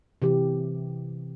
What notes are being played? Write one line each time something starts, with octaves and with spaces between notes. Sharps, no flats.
C3 E3 G4